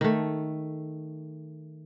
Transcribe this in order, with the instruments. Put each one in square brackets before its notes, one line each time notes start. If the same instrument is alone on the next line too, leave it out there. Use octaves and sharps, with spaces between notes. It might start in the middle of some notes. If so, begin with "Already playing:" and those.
[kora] D#3 A3